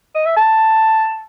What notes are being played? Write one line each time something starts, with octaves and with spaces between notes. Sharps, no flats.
D#5
E5
A5